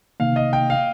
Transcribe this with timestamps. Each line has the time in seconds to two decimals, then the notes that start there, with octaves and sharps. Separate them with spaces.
0.20 C3 D#3 A#3 D#4 F5
0.36 D#5
0.53 G5
0.70 F5